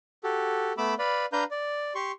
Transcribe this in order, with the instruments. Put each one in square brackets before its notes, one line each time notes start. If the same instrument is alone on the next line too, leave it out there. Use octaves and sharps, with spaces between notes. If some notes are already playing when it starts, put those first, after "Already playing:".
[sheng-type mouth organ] F#4 G4 A4
A3 B3 B5 D6 E6
B4 D5 F5 B5
D4 B4 F5 A#5 G6
D5
G4 C6 C#6